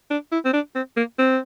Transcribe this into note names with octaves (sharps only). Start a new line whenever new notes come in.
D4
E4
C4
D4
C4
A#3
C4